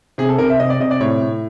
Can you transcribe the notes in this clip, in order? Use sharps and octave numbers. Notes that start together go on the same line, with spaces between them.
C3 G#4
A4
C3 A#4
E5
C3 D#5
D5
C3 D#5
D5
A2 C#5
A2